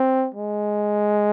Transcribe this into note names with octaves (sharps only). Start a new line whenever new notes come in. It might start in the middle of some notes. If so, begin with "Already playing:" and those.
Already playing: C4
G#3